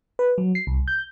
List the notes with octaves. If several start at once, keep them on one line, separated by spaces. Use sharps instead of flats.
B4
F#3
C7
C2
G6